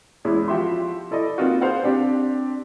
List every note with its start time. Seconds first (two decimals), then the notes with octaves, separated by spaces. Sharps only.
0.25 E2 G#3 C#4 E4
0.48 F3 F#4 G4 E5 C6
1.11 E4 A4 D5 D#5
1.38 A#3 C4 D#4 F4 F#4
1.61 G#4 C5 F5 F#5
1.83 C4 D4 G4